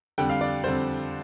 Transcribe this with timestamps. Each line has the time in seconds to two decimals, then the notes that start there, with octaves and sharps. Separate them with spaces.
0.18 F2 D3 G3 G5
0.29 F5
0.41 D5
0.63 F2 D3 G3 C5